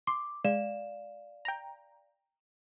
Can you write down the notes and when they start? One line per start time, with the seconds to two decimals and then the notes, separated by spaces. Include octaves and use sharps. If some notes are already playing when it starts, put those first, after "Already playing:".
0.07 C6 D6
0.45 G#3 D5 F5 E7
1.45 G5 A#5